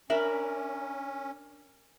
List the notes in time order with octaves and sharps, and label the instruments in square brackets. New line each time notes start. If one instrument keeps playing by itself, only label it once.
[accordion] C#4 [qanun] D4 A#4 B5 [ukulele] E5